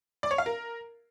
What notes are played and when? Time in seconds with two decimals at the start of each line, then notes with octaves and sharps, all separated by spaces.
0.23 D5
0.31 C#5
0.38 F5
0.46 A#4